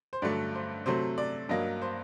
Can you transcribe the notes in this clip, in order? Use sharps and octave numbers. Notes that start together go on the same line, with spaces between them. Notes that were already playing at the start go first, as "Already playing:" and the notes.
C5
G2 D3 F#3 A3 D5
C5
C3 F#3 A3 C5
D5
G2 F#3 A#3 D#5
C5